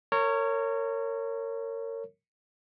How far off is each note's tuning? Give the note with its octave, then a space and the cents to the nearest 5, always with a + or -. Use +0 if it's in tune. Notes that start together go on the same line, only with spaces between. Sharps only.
A#4 -30 C#5 +0